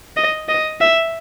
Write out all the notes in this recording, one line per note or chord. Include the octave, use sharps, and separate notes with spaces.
D#5
D#5
E5